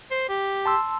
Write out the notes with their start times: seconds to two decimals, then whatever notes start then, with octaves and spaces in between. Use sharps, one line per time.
0.11 C5
0.29 G4
0.66 A5 C6 E6